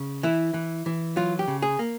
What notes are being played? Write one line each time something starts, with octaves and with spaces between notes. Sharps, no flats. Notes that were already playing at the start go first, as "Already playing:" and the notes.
Already playing: C#3
E3 E4
E3
E3
F#3 F4
G4
C#3
G#4
A#3